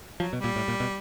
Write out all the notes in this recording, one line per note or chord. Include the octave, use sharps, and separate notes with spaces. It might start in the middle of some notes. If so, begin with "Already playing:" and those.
F3 F#3
B2
G3
A#2
A2
A#2
B2